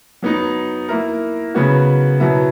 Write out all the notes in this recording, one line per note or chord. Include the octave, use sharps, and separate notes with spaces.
F#3 B3 D#4
A#3 E4 A#4
C#3 F#3 B3 F#4
B2 F#3 B3 E4